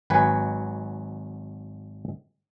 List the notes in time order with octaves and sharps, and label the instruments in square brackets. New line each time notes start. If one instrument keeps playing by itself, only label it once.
[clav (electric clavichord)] G#1 F#3 B4 G#5